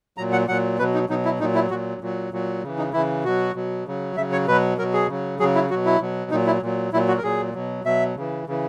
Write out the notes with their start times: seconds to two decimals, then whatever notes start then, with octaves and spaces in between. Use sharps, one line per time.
0.17 A#2 F#3 A#5
0.32 F#5
0.48 A#2 F#3 F#5
0.79 B2 F#3 B4
0.94 D#4
1.09 B2 F#3 D#4
1.25 E4
1.39 A#2 D#4
1.43 F#3
1.55 E4
1.70 A#2 F#3 F#4
2.01 A#2 F#3
2.33 A#2 F#3
2.63 C#3 E3
2.78 D#4
2.93 C#3 E3 E4
3.24 B2 F#3 F#4
3.55 B2 F#3
3.86 C#3 F#3
4.16 C#3 E5
4.20 F#3
4.32 C#5
4.47 B2 F#3 B4
4.78 F#3 A#4
4.81 B2
4.93 G#4
5.09 C#3 F#3
5.39 F#3 G#4
5.42 C#3
5.55 E4
5.70 B2 F#3 F#4
5.86 E4
6.01 B2 F#3
6.31 A#2 F#3 D#4
6.47 E4
6.62 A#2 F#3
6.93 A#2 F#3 E4
7.08 F#4
7.18 A#4
7.23 A#2 F#3 G#4
7.54 B2 F#3
7.85 B2 F#3 E5
8.16 C#3 E3
8.47 C#3 E3